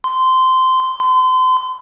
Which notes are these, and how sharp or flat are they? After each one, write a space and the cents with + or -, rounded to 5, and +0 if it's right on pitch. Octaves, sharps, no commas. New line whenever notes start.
C6 -15
C6 -35